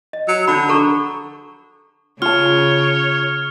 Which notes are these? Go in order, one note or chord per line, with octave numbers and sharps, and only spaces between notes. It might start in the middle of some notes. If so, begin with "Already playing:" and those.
D#5
F#3
D3 D4 B5
A4 A#5 C#6
C#3 F4 C#5 A5 F6